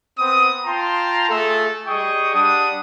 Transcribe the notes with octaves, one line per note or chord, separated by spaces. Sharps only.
B3 C4 C5 D#6
F4 G5 A5 A#5 C6
A3 F4 G#4 A4
G3 G#4 D#5 G5 C#6 D#6
G3 D4 F#5 D#6